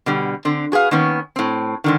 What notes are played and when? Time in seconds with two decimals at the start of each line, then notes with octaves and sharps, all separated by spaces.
0.06 B2 D3 G3
0.45 D3 C4
0.72 F#4 G#4 B4 F5
0.91 D#3 A#3 B3 C#4
1.36 A2 C4
1.84 G#2 D3 D#3